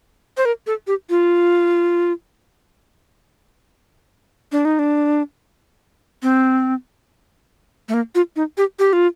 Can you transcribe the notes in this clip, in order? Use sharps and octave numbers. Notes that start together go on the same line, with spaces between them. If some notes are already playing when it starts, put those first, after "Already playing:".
C5
A#4
A4
G4
F4
D4
D#4
D4
C4
A3
A#3
F4
D#4
G4
G4
F4